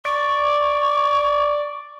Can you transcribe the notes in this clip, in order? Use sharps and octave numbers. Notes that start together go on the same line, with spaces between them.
D5 C#6